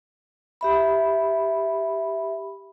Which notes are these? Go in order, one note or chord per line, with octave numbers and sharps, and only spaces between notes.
G4 E5 B5